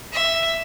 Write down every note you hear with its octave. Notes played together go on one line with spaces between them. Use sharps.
E5